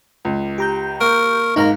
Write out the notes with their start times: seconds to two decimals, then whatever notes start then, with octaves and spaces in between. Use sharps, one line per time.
0.25 C#2
0.58 G4 A#5 G6
1.00 A#3 A#4 C#6
1.56 G#1 G#2 A#3 D#4 F5 A#5